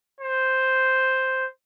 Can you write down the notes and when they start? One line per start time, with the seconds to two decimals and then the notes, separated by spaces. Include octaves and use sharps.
0.20 C5